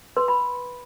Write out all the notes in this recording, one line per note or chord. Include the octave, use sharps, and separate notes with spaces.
B4 C6
B5